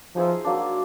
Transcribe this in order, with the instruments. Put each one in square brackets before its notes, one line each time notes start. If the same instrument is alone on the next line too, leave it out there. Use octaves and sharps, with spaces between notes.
[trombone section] F3 [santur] D#4 G#4 C5 E5
[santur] F#3 A#3 D4